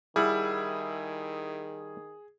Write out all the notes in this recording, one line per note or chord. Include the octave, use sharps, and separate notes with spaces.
D#3 G3 E4 G#4 F#5